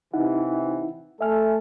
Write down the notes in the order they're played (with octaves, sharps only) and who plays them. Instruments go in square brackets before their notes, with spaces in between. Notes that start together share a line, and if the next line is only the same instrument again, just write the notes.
[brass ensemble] C3 E3 [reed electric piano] D#4 E4 F#5
[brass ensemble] A3 A4 [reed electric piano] E5 G#5 F6